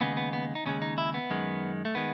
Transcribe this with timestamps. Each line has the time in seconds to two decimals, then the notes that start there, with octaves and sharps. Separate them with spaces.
0.01 D#2 C#3 G#3 B3
0.17 B3
0.33 B3
0.55 D#4
0.66 D#2 C#3 G#3 C#4
0.82 D#4
0.98 E4
1.14 B3
1.30 F#2 D#3 G#3
1.85 A3
1.95 D#3 G#3 B3